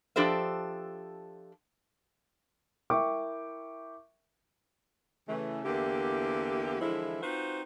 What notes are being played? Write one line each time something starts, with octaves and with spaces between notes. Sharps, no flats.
F3 D4 G4 A4 C5 E5
E4 A#4 E5 G5 C#6 D6
C#3 E3 A3
E2 D3 A#3 E4 G4
D3 E3 F3 G#3 E4
C4 D#4 F4 F#4 B4 C5